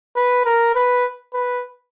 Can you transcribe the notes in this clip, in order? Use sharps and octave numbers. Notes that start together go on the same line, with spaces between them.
B4
A#4
B4
B4